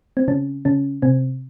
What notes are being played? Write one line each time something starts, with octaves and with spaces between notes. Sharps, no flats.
C4
C#3 C#4
C#3 C#4
C3 C4